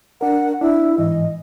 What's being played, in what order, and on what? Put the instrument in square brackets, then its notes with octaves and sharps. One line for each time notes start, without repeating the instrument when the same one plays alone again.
[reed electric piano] D4 A#4 [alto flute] F#5
[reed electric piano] D4 [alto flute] E4
[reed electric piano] G#2 E3 [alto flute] D#5